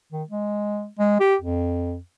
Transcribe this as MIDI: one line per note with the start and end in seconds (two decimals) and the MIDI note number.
0.12 0.23 51
0.29 0.87 56
0.99 1.17 56
1.20 1.36 67
1.42 1.98 41